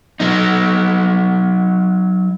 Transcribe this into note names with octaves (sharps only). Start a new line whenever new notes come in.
F#3 D#4